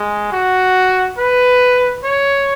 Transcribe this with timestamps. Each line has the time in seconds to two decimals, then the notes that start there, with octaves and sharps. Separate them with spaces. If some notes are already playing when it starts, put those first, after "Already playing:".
Already playing: G#3
0.32 F#4
1.18 B4
2.04 C#5